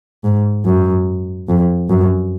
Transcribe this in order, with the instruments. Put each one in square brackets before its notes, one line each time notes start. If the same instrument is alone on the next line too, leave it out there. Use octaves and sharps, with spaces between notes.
[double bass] G#2
F#2
F2
F#2